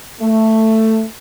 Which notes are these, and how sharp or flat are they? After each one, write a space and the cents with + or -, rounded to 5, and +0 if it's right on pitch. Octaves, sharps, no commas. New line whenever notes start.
A3 +10